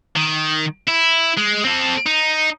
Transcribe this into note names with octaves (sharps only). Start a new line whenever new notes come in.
D#3
E4
G#3
C4 A4
D#4